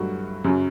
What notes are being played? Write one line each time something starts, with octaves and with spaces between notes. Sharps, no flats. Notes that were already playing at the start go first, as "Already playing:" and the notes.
Already playing: G2 F#3 A3 F#4
F#2 C#3 F#3